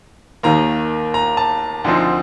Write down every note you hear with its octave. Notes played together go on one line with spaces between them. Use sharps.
D#2 D#3 A#3 A#5
A#5
A5
D2 D3 F3 C4 D#4